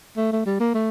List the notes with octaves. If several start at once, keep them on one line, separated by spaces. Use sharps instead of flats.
A3
A3
G3
A#3
A3